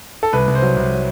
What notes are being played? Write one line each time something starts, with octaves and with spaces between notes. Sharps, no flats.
A4
C2 B4
C2
C5
F#3
C2
F#3